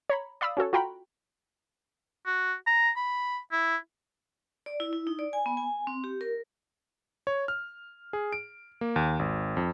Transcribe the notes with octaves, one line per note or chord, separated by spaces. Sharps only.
C#5 A#5 B5
D5 F5 B5 D#6 E6
C#4 F#4 A4 C#5
F4 F#4 G5 A#5 B5
F#4
A#5
B5
E4
D5
E4
E4
D#4
D5
G#5
B3
G#5
C4
G4
A#4
C#5
F6
G#4
D7
A#3
D#2
G#1
F2